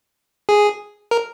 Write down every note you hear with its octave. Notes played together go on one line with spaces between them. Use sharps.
G#4
A#4